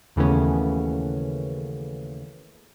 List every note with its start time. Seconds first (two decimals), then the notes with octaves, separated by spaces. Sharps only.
0.16 D#2 C#3 E3 A3 B3 C#4